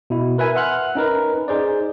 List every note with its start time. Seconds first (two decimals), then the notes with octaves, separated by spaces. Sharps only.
0.10 B2 E4
0.38 A#4 B4 E5 G#5
0.55 E5 F#5 C6 F6 F#6
0.95 C#4 D#4 A#4 B4
1.48 D#4 G#4 C5 D5